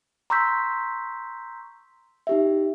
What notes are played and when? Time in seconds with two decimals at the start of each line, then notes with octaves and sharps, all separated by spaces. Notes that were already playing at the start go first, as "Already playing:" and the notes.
0.30 A#5 C6 C#6 E6 G6 B6
2.27 D#4 G4 E5